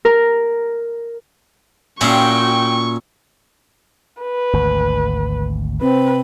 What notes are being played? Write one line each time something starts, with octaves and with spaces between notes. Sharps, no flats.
A#4
A#2 C#4 E4 F#4 G5 C6 C#6
B4
G#1 D2
C3 C4 B4